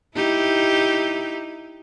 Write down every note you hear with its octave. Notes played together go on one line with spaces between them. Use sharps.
D#4 E4 G4